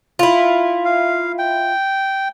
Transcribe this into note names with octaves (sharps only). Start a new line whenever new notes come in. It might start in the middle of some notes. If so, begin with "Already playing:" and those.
E4 F4
F5
G5